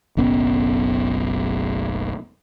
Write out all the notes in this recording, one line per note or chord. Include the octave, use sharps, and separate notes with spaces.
F#1 B1 B3 C#4